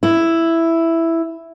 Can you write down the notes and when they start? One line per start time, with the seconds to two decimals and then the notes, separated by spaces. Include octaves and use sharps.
0.03 E4